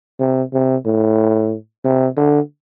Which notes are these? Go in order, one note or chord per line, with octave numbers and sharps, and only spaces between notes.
C3
C3
A2
C3
D3